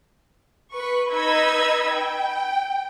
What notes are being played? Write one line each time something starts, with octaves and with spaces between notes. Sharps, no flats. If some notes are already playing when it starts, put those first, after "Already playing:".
B4 C#6
D#4 B4 D#5 B5 E6 G#6
G5